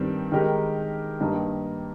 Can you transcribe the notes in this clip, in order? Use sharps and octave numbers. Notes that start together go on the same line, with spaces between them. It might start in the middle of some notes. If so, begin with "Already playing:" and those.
Already playing: G2 D#3 G3 C4
D#3 G#3 D#4 G4 A#4
G2 D#3 A#3 D#4 G4